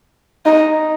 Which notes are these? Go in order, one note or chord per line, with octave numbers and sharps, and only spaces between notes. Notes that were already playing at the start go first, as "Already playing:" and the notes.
D#4